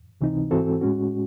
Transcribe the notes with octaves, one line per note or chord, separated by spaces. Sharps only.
C#2 C3 E3 C4 D#4
G#2 E3 C4 F#4 A4
A2 G#3 C#4 F#4